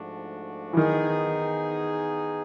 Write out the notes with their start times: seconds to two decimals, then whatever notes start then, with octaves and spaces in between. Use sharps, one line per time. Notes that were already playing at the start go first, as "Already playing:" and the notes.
Already playing: G#2 F3 A3 D4 F#4
0.73 E3
0.77 D#3 B3 D#4 G#4